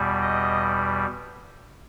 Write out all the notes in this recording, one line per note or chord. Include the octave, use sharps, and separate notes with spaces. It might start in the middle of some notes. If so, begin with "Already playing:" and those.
Already playing: E2 B2 G3
D#5